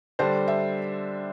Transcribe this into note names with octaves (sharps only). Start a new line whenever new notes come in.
D3 G3 D4 C5
E5